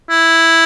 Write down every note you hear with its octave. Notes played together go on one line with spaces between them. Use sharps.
E4